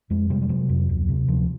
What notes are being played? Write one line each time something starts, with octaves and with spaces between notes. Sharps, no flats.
F2 G#3
C3 G3
G3
C3 F#3
F2
D2
C3
D2 F3